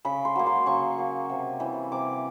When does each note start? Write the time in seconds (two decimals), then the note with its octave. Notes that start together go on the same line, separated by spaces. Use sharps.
0.05 C#3 B5
0.25 C6
0.35 F#3 A#3
0.46 C6
0.66 C#3 C#6
0.98 F#3 A#3
1.30 C3
1.60 E3 G3 C4
1.92 C3 D6